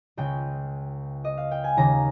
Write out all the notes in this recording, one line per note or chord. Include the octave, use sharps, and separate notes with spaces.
C#2 C#3 G5
D#5
F5
G5
G#5
D#2 C#3 A#5